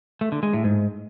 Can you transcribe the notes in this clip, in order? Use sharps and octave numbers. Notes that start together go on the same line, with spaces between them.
A3
D3
G#3
A2
G#2